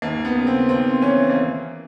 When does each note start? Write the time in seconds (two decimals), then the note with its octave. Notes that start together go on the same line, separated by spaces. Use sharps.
0.02 D#2 A#3
0.25 B3
0.35 C#3
0.47 C4
0.69 D#2 C4
1.02 E3 C#4
1.30 A#3